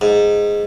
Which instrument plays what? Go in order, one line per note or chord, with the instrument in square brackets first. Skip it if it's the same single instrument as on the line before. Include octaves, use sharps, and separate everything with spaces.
[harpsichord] G#2